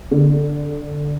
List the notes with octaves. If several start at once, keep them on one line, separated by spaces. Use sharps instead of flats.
D3